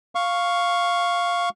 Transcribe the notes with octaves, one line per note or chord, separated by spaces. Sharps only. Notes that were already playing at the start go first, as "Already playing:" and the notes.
F5 C#6